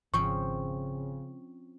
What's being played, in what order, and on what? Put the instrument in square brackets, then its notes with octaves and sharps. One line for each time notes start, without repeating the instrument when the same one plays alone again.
[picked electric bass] G#1 [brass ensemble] C#3 [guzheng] F3 C4 C#4 [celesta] C#6